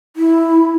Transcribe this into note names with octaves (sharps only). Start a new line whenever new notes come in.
E4